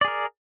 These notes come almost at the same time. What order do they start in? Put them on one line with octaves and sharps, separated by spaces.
D5 G#4 A#4